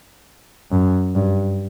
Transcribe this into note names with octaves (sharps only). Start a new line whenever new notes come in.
F#2
G2